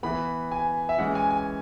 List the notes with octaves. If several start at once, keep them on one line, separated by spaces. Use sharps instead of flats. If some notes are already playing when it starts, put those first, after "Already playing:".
E3 B3 B5
G#5
E5
E3 G#3 C#4 F#5
G#5
G#5